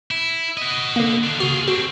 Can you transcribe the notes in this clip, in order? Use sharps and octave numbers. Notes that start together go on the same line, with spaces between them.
E4
F#4 D#5
D3 A#3
D#3 D4
C#3 F4 F#4 G#4
C4 D4 F#4